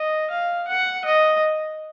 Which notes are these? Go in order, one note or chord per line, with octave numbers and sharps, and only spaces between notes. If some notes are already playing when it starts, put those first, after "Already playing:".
Already playing: D#5
F5
F#5
D#5